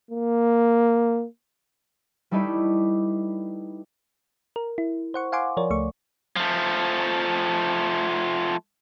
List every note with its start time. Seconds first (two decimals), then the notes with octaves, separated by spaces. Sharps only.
0.10 A#3
2.31 G3 A3 D#4 E4 B4 D5
4.56 A#4
4.78 E4
5.14 C5 F#5 C#6
5.32 F5 F#5 G#5 C6 D6
5.57 F3 A#4 C#5 D5
5.70 C#2 A3 C#6
6.36 F3 A3